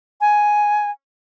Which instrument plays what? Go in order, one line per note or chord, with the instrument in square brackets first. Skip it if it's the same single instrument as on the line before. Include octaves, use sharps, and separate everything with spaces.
[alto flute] G#5